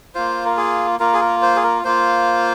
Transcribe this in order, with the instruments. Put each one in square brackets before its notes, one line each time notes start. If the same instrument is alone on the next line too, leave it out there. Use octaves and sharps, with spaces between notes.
[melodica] A#3 F4 C5
A#4
G#4
A#3 F4 A#4
G#4
A#4
C5
G#4
A#4
A#3 F4 C5